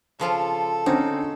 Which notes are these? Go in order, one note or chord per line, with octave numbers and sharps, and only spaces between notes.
C#3 F3 F4 A4
D3 C4 C#4 D#4